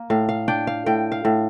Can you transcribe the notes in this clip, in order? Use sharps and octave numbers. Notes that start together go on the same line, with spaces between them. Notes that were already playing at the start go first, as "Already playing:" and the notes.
Already playing: A#3
A2 F5
F5
D4 G5
F5
A2 G5
F5
A2